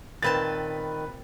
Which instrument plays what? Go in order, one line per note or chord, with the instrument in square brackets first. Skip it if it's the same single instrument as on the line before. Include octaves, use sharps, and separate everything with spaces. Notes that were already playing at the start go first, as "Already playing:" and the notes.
[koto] A#2 C4 A5 [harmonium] D#3 [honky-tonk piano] B4 A6